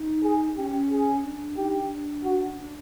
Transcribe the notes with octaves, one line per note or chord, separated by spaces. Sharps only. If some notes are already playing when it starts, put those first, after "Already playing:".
Already playing: D#4
G#4
C#4 G4
G#4
D4
D#4 G4
D4
F#4
D4